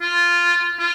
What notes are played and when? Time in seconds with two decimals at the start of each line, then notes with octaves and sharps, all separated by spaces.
0.02 F4
0.79 F4